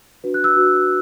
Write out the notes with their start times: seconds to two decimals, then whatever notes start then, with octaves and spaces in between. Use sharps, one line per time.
0.24 D4 F#4 B4
0.34 F#6
0.44 E6
0.56 D4 F#4 B4